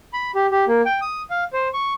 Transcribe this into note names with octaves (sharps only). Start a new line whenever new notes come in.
B5
G4
G4
A#3
G5
D#6
F5
C5
C#6